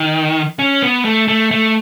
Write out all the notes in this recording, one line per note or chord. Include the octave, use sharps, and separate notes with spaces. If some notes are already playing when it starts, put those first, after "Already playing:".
Already playing: D#3
C#4
B3
A3
A3
A3